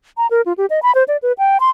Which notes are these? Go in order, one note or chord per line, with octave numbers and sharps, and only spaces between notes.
A#5
A#4
F4
G4
D#5
B5
C5
D5
B4
G5
C6